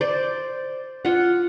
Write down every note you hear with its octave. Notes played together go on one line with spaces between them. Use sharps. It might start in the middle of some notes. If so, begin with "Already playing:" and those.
C5 D5
F4 F#5